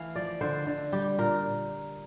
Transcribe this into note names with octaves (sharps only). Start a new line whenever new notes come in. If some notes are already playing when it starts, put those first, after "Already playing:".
Already playing: E3 A3 F5
F3 D5
D3 C5
D3
G3 G4
A#2 A#4